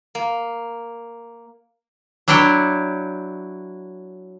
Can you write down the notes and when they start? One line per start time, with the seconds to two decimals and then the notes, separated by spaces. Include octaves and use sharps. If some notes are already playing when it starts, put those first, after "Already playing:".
0.15 A#3
2.28 F#3 D4 E4 F#5 G5